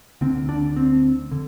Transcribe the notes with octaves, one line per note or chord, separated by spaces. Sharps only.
D2 D3 C4
D4
C4
D3